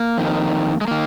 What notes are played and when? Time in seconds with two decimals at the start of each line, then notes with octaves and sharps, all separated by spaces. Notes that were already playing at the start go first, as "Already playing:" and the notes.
Already playing: A#3
0.18 F2 D#3
0.81 G#3
0.88 D#3 A#3